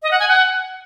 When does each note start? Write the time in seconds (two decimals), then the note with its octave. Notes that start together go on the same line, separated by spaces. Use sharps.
0.02 D#5
0.11 F#5
0.19 G#5
0.28 F#5